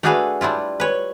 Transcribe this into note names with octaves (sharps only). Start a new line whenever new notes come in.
A3 D4 F#4 G#4 B4 F5
G3 D4 E4 F4
B4 C#5